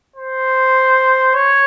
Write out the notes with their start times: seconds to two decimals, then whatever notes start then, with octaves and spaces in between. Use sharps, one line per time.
0.16 C5
1.35 C#5